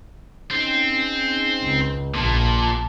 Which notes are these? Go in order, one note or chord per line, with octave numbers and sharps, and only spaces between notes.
C4 C#4 D#4 G#4
C#2
A#1 A#2 A5